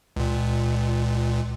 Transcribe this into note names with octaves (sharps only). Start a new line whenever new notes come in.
C#2 A#2